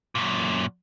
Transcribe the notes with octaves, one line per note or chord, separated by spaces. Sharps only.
F#2 A#2